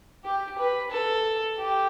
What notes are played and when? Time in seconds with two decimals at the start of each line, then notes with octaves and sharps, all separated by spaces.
0.24 G4
0.58 B4
0.91 A4
1.58 G4